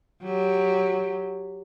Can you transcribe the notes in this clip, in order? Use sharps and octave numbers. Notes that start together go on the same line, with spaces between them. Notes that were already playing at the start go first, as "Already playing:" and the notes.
F#3 G4